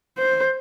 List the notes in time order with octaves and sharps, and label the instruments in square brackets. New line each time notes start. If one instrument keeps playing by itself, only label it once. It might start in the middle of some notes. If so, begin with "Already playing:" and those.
[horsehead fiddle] C5